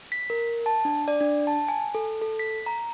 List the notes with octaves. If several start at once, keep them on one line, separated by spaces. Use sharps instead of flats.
B6
A#4
A5
D4
D5
D4
A5
G#5
A4
A4
B6
A#5